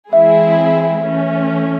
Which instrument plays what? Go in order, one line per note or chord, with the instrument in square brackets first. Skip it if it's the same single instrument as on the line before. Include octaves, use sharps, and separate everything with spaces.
[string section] E3 G#3 C4 E4 G#4 [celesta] E5
[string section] E3 A3 C#4